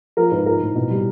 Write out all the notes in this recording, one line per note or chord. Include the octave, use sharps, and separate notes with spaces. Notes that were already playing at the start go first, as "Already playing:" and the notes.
F3 A#4
G#2 B4
F3 A#4
A2
B2
G3